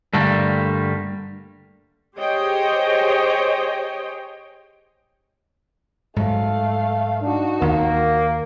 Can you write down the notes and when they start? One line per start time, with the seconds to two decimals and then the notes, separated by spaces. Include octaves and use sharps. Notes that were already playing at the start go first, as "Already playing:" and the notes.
0.14 G2 D3 G3 A3 A#3
2.17 G4 G#4 C5 C#5 D#5 G5
6.16 G#2 F#3 A3 F5
7.22 D4 D#4 F#4
7.62 D#2 A#3